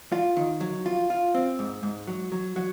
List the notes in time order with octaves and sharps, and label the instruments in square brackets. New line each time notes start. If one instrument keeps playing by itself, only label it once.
[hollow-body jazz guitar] F4
D#3
F#3
F4
F4
C4
G#2
G#2
F#3
F#3
F#3